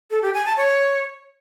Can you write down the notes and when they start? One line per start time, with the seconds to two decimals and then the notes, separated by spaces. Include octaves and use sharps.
0.11 A4
0.22 G4
0.34 G#5
0.46 A5
0.57 C#5